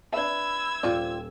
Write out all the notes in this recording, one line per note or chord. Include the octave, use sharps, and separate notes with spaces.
D4 B4 E5 B5 E6 G#6
D#1 F3 F4 D5 G5